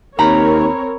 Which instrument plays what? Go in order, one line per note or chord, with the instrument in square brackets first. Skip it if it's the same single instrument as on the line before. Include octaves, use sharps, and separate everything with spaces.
[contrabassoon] D#2 [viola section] C4 A#4 C#5 [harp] A#5 B5